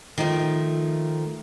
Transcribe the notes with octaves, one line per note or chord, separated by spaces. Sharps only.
D#3 F3 A3